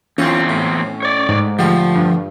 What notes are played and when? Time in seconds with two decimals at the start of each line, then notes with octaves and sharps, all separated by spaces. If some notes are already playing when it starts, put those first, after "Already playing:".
0.18 E2 C4 C#4 F4 A4
0.49 A2
1.03 C#5 D5
1.29 G#2
1.59 D3 F3 G3 A3
1.96 G2